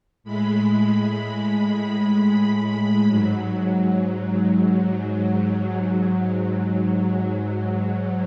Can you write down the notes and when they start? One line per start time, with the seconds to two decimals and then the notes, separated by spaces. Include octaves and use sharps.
0.24 A2 G#3 B5
3.06 G#2 F#3